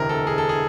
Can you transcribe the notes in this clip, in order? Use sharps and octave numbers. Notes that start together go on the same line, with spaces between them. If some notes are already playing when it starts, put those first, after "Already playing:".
Already playing: E1 D2 C3 E3 A#4
A4
G#4
A4
G#4